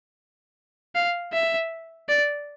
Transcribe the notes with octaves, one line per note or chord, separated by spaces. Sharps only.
F5
E5
D5